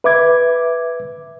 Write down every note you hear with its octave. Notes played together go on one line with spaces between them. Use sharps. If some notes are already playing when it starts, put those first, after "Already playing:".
B4 E5 D6 G#6